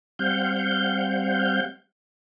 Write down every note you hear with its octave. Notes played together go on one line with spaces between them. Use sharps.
G3 C4 F5 F#5 G6